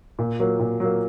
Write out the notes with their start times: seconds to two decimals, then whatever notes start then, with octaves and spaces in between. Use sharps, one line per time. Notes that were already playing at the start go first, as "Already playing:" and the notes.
0.19 A#2
0.40 F#3 A#3
0.60 A#2
0.80 F#3 A#3